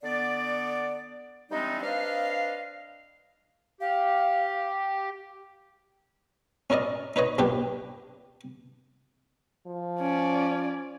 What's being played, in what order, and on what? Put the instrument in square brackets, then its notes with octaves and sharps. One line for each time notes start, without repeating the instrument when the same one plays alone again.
[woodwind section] D3 B3 D5
E3 G3 G#3 C4 D4 D#4
C4 D4 B4 D#5 F5
[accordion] G4 [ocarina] F5
[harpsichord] C#4 E4 A#4 D5 D#5
D#4 B4 C#5 D#5
B1 A#2 D4 G4 B4
[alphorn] F3
[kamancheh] C#4 D5